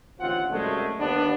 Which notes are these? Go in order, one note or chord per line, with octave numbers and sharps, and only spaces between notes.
A1 D#2 D3 C4 F4 F#5
C2 F#2 G#3 A3
D#2 B3 D4